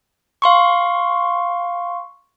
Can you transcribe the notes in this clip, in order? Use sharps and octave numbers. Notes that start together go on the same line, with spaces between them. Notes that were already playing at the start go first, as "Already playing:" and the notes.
F5 C6 C#6